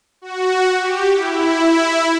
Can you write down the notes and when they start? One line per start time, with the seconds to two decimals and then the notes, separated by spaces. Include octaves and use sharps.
0.22 F#4
0.79 G4
1.14 E4